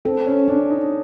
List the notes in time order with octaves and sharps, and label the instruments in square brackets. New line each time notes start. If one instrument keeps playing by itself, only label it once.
[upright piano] C4 [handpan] A4
[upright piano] C#4
[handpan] C#4 [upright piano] D4
[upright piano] D#4